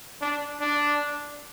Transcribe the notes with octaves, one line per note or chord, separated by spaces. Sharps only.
D4
D4